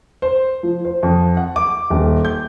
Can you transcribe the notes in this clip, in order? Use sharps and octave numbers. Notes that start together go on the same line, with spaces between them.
C5
F3
C5
F2
F#5
D6
D#1
G6